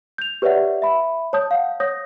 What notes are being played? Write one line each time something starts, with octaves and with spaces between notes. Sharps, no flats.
G6 F7
G4 B4 C#5 D5 E5 F#5
E5 B5
C#5 A5 D#6 G6
F5 F#5
C#5 D#6 G6 A#6